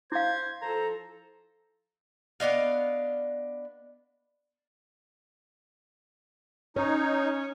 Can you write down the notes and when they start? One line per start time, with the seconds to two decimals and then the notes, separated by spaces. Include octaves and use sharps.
0.12 E4 C5 F5 G#6
0.62 F3 A4 C5 A#5
2.40 B3 D4 D#5 F5
6.76 C#4 D#4 C#5